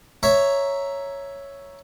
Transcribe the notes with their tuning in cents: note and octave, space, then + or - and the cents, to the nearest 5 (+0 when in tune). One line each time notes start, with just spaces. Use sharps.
C#5 +0 E5 +0 A#5 +0